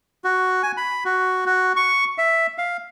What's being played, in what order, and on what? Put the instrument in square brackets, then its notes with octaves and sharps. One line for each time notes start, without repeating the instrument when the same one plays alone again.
[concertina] F#4
G#5
B5
F#4
F#4
C#6
E5
F5